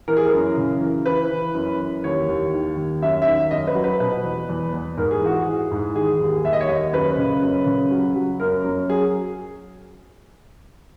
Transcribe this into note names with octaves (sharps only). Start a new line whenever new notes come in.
E3 A#4
G#4
A#4
F#2
C#3
E3
E3 B4
E3
F#2
E3
D#2 C#5
D#2
D#3
D#2
F#2 E5
E5
D#3
F#2 D#5
B4
F#3
B4
B2 B4
E2
E2
E2
G#2 A#4
G#4
E3 F#4
G#4
E3
G#2
D#3 G#4
D#2
D#2 E5
D#5
C#5
D#2 D#5
F#2 B4
C#3
F#2
C#3
F#3
F#3
F#2 A#4
F#2
F#3 G#4